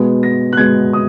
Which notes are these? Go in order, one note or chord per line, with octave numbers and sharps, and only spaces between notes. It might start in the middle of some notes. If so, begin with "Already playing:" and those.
Already playing: B2 G#3 B3
A#6
F#6
B2 G#3 B3 G#6
D#6